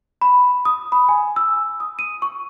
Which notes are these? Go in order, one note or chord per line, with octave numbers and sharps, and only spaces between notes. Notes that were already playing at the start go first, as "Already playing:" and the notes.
B5
D#6
B5
G#5
E6
D#6
D#7
C#6